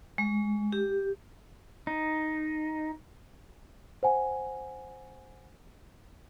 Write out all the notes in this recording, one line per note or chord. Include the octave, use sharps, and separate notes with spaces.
G#3
G4
D#4
C5 F#5 G#5